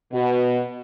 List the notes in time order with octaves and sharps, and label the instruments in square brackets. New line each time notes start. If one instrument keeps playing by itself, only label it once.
[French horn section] B2